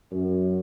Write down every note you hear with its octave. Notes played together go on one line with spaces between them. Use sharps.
F#2